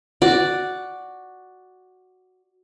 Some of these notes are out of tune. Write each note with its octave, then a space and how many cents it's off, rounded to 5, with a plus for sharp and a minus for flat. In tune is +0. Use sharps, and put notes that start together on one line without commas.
F#4 +0 D5 +0